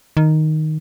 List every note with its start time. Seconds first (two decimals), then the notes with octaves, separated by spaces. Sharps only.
0.17 D#3